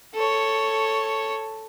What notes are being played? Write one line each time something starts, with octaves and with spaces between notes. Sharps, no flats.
A4 C#5